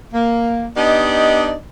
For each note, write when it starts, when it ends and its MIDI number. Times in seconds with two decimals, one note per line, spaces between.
0.13 0.66 58
0.76 1.54 59
0.76 1.54 62
0.76 1.54 63
0.76 1.54 67
0.76 1.54 74
0.76 1.54 75